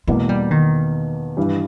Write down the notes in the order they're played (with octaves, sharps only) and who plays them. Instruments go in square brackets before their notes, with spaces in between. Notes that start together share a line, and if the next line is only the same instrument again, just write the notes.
[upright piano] E2 B2 A#3 [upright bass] G#3
[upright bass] G3
D#3
[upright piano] G2 E3 G3